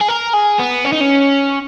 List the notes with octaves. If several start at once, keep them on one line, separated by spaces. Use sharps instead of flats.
G#4
A#4
G#4
B3
C#4
D#4
C#4